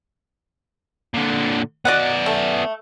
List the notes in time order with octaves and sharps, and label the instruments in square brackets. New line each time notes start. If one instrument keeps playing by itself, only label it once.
[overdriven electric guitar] A#2 D3
[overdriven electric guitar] B3 D5 [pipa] F#4 D#5 F#5
[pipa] A3